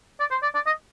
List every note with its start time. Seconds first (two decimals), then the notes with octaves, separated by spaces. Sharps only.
0.20 D5
0.31 C5
0.42 D5
0.55 D5
0.66 D#5